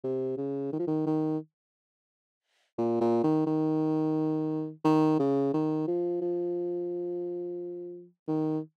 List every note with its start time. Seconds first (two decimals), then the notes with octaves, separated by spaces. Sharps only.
0.04 C3
0.37 C#3
0.72 D#3
0.79 F3
0.87 D#3
1.06 D#3
2.78 A#2
3.01 A#2
3.24 D#3
3.47 D#3
4.84 D#3
5.19 C#3
5.54 D#3
5.88 F3
6.21 F3
8.28 D#3